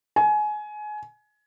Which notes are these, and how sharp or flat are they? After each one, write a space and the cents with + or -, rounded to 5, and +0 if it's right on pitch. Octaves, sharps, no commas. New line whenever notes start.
G#5 +25